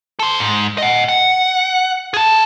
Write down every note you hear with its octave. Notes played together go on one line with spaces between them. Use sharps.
A4 C5
G#2
D#5 F#5
F#5
G#4 A5